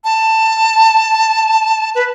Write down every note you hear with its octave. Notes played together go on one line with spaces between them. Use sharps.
A5
B4